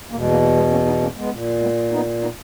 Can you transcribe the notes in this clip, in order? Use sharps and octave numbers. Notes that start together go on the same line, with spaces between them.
E2 B2 A#3
G#3
A#3
A#3
G#3 B3
A#3 C#4
B3 D#4
A#3 C#4
G#3 B3
A#2
G#3 B3
B3 D#4
B3 D#4